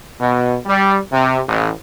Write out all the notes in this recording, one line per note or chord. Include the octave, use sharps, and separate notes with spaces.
B2
G3
C3
A1